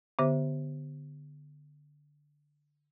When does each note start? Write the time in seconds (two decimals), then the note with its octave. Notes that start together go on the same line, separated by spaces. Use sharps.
0.19 D3 B3 G4 C5 E5